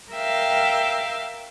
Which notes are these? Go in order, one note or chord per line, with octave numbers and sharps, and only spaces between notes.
A#4 E5 F5 G5